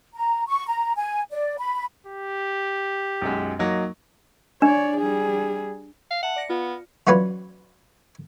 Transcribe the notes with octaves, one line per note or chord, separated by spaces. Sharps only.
A#5
C#6
A#5
G#5
D5
B5
G4
B1 F#2 G#3
F#3 A#3 D#4
D4 C#5 D5
G3 G#4
F5
E5 F#5 A5
D5 A#6 C#7
B3 F4
E3 F#3 C#4 F4 B4 D5